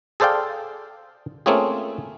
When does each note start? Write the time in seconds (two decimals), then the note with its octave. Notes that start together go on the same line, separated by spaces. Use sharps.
0.20 G#4 A4 C5 D5 F5 G5
1.46 A3 A#3 C4 C#4 F4 G#4